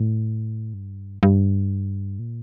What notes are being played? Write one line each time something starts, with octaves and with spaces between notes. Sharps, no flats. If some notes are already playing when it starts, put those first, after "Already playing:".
Already playing: A2
G2
G2
A#2